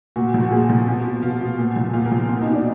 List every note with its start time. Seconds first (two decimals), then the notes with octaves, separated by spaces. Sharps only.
0.16 A#2 F#4
0.34 F3
0.40 F#4
0.51 A#2 G#4
0.69 F3
0.87 B2
1.05 B2
1.23 B2 F4
1.41 B2
1.58 A#2
1.76 F3
1.93 A#2 F4
2.06 A#3
2.12 F3
2.29 B2 F4
2.41 D#4
2.47 B2
2.53 D4